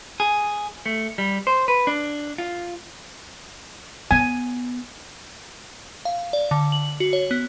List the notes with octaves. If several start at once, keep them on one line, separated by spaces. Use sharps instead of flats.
G#4
A3
G3
C5
B4
D4
F4
B3 G#5
F5
D5
D3
F#7
F#4
C#5
B3